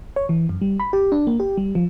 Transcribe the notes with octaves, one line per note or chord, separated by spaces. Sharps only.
C#5
E3
F#2
G3
B5
G4
D4
A#3
G4
G3
F3